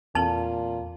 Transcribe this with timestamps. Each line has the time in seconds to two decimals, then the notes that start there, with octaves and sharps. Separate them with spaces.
0.15 E2 A#2 C4 A4 A5